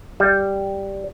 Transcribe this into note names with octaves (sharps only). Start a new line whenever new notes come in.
G3